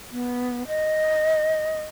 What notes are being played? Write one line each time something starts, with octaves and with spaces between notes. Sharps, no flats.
B3
D#5